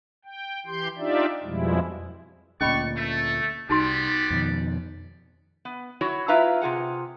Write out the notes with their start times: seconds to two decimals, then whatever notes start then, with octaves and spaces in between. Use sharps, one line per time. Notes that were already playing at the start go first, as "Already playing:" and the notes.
0.25 G5
0.66 E3 G4 C6 G6
0.98 D4 D#4 F4 G4 D5 E5
1.44 F2 B2 F3 G3 G#3 E4
2.61 D2 A#2 C#4 D5 D#5 B5 C#6
2.97 A3
3.69 C2 G3 B3 D#4 F#4 D5 C6
4.30 F2 B2 D#3
5.65 B3
6.01 F#3 E4 F#4 C#5
6.28 E4 F4 B4 E5 F5 A#5
6.61 C3 F4 G#4 F#5